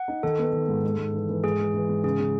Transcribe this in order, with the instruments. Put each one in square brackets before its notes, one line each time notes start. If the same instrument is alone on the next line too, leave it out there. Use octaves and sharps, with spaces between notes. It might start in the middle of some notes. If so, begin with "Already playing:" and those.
Already playing: [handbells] F#5
[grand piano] D#4
[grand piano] D#3 [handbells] A4
[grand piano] B3
D#3
G#2
G#2
G#2
E3
E3
[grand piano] G#2 [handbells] G#4
[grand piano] E3
E3
G#2
[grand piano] C#3 [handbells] G#4
[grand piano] C#3